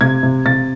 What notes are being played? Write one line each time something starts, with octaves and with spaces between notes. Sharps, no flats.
C3 G#6
C3
C3 A6